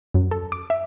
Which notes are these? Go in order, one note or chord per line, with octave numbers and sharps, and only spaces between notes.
F#2
A4
D6
E5